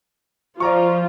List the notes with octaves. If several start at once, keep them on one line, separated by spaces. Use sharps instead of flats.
F3 F4 D5 A#5 C#6